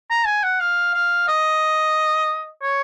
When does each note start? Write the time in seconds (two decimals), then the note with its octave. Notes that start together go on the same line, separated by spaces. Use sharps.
0.10 A#5
0.26 G#5
0.43 F#5
0.60 F5
0.94 F5
1.28 D#5
2.62 C#5